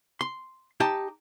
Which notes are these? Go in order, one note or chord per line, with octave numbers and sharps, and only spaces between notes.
C6
D#4 G4 A5